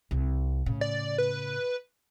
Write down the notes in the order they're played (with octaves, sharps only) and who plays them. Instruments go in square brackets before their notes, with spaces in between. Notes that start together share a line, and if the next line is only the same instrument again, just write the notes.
[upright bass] C2
A2 C#3
[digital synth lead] D5
B4